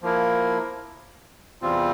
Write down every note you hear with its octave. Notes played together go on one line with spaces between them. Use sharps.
F3 A#3 E4 A#4
E2 C3 G3 C4 F4